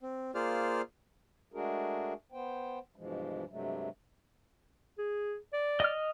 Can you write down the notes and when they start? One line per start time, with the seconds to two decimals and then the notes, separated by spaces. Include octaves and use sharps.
0.03 C4
0.35 A#3 F4 G#4 C5 D5 F6
1.54 G#3 A3 D4 F#4 G#4 A#4
2.32 B3 C5 G5
2.96 G2 B2 E3 F3 G#3
3.49 G2 C3 F#3 G#3 A3
4.98 G#4
5.53 D5
5.80 D#5 F6